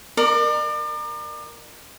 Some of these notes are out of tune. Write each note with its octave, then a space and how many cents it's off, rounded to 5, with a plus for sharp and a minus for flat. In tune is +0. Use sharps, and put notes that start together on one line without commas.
A#4 +5 D5 +40